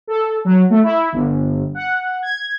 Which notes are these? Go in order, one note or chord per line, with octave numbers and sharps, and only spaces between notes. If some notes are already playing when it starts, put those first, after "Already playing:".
A4
F#3
A3
E4
G1
F#5
G#6